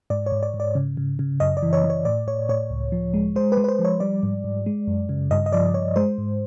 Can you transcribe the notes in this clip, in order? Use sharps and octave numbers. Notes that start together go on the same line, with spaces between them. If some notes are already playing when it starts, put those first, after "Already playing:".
G#2 D5
C#5
G#2
D5
G#2
D5
C#3
C#3
C#3
F#2 D#5
D5
E3
C#5
E3
C#5
A2 D5
A2 C#5
A2 C#5
C#2
F3
G#3
G#3 C5
B4
G#3
B4
C5
F3
C#5
G3 D5
G#2
G#2
G#3
F#2
C#3
G2 D#5
D#5
F3 D5
G2 C#5
G#3 C5
G#2